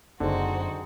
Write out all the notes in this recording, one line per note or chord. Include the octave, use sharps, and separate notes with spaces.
F#1 D3 C4 D#4 F#4 G#4